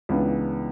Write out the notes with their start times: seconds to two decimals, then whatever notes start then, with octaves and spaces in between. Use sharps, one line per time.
0.09 C#2 C#3 E3 B3 D4